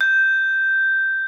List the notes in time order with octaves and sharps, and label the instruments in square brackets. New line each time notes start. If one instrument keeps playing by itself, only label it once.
[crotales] G6